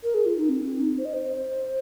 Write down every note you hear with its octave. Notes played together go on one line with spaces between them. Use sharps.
A#4
G#4
F4
D#4
C4
C4
D#4
C5
D#5
C5